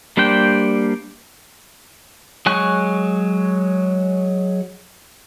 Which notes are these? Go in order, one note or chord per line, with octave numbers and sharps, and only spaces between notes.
G3 A#3 D4 C5 G5
F#3 G#3 G#5 C#6 F#6